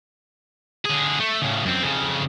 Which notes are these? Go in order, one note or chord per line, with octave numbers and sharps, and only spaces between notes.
D3 G#4
A3
A2 C#3
F#2 C4
F2 C#3